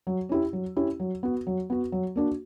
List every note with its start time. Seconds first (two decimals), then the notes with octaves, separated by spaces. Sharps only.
0.07 F#3
0.29 C#4 E4 G4
0.53 F#3
0.76 C#4 E4 G4
1.00 F#3
1.23 B3 F#4
1.47 F#3
1.70 B3 F#4
1.92 F#3
2.16 A#3 D4 F#4